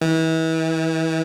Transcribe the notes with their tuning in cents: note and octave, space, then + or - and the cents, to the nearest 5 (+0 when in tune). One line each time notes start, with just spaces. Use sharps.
E3 -35